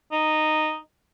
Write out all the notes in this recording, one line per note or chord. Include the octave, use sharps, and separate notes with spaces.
D#4